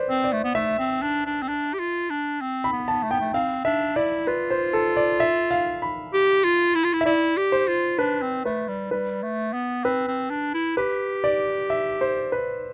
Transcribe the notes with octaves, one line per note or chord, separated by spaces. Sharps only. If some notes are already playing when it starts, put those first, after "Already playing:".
Already playing: B4 C5 D5
C4
D5
A3
B3
A3 E5
C4
D4
D4
C4
D4
G4
F4
D4
C4
B5
B3
A5
A3
B3 G5
A3
C4 F5
D4 E5
E4 D5
F4 B4
C5
A4
D5
E5
F5
B5
G4
F4
E4
F4
E4
E5
E4 D5
G4
C5
F4
D4 B4
C4
A3 B4
G3
G3 B4
A3
B3
C4 B4
C4
D4
E4
G4 B4
D5
E5
C5
B4